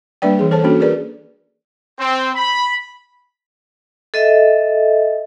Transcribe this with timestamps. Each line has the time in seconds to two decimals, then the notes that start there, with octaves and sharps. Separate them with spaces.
0.22 G3 A#3 D4 B4 D5 G5
0.39 E3 G#4
0.51 A4 C5 C#5 A5
0.64 A#3 C#4 D4 F#4 A4
0.80 G#4 A#4 B4 D5
1.99 C4
2.35 B5
4.14 A4 D#5 E5